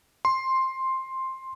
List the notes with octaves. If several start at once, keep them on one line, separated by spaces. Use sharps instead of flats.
C6